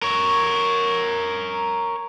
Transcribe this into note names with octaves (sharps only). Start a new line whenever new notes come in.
A#4 C#5